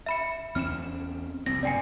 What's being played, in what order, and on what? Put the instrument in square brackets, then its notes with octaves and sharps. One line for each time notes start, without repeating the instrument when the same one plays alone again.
[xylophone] E5 B5 C#7
[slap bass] E2 C4 C#4 [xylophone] F6 E7
[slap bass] F1 C2 C4 [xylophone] A#6
[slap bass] F#1 G2 B2 [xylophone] D5 G5 G#5